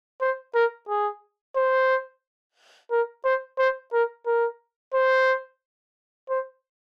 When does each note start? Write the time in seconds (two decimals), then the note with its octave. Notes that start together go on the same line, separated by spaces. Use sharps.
0.21 C5
0.55 A#4
0.89 G#4
1.56 C5
2.91 A#4
3.25 C5
3.59 C5
3.93 A#4
4.27 A#4
4.94 C5
6.30 C5